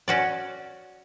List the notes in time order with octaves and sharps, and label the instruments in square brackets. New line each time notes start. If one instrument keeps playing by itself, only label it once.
[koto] C#4 F#4 D5